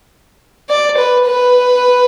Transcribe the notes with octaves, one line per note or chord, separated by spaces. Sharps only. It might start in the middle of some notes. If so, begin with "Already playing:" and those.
D5
B4
B4